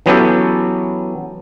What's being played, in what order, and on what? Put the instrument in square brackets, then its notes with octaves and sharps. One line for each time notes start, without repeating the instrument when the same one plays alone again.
[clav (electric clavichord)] E3 F#3 B3 C#4 G4 A4